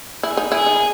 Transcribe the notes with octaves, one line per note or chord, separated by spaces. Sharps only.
E4 G#4
D#4
E4 G#4
D#4